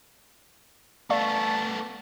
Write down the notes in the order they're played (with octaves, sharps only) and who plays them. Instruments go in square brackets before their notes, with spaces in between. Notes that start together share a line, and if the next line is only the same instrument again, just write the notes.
[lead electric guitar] A3 B3 [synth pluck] D5 F5 C#6 [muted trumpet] A5